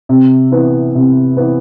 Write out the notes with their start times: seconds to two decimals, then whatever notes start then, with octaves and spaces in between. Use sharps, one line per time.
0.09 C3
0.52 E3 B3
0.95 C3
1.37 E3 B3